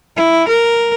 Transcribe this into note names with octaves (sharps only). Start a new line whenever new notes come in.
E4
A#4